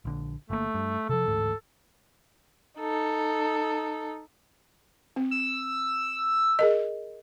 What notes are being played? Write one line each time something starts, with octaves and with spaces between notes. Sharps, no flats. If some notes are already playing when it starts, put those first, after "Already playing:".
A#1 D3
G1 A#2 A3 A#3
G2
C3 F3 A4
A1 D2 G#2
D#4 A4
C4
E6
G#4 A#4 D#5